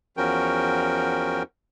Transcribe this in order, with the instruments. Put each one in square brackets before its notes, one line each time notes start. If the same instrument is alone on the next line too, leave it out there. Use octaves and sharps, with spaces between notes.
[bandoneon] E2 F3 C#4 F#4 A#4 G5